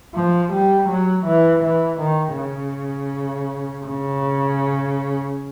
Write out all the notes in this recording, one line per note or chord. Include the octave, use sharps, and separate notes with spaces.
F3
G3
F#3
E3
E3
D#3
C#3
C#3